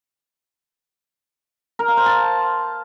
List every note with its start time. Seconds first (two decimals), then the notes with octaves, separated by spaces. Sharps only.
1.79 A#4
1.88 F5
1.97 C5
2.06 A5